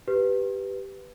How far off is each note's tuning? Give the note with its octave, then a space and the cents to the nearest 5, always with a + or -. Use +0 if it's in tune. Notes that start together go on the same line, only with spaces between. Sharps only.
G4 +0 B4 +0